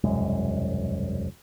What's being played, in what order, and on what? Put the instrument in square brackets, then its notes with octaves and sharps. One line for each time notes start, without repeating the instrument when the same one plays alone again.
[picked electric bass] E1 C2 F#2 G#3